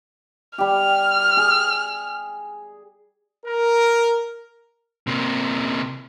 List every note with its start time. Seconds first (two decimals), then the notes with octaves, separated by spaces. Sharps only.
0.58 G3 G4 F6
1.37 G#4
3.46 A#4
5.07 C3 A#3